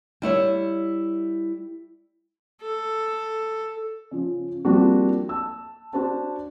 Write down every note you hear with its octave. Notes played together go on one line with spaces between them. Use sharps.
G3 E4 C#5 E5
A4
C#3 F3
F3 G3 A#3 C4 D4 F#4
A5 E6
D4 F#4 C5 A5